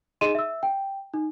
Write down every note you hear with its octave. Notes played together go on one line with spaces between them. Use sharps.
D#4 G#4 D#5 C6 D#7 E7
E5 E6
G5
D#4